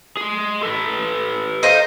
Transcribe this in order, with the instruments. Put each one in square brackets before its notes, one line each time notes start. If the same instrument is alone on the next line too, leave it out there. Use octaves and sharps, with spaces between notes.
[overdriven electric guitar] G#4 C6
A4 B4
[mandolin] D#4 C5 F5